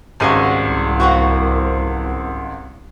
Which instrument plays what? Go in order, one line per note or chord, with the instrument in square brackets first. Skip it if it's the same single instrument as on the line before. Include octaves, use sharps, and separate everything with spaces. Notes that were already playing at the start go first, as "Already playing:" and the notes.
[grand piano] G#1 C#2 D#7 [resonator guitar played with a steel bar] G3 G#3 F#4
[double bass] C2
[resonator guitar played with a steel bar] A#3 C4 F#4